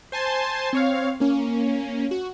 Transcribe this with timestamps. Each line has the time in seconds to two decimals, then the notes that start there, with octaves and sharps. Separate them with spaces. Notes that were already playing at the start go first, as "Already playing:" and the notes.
0.12 C5 G#5 A5 C6
0.73 C4 C#5 F5
1.20 A#3 C#4
2.11 F#4